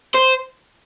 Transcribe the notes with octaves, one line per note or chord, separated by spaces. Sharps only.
C5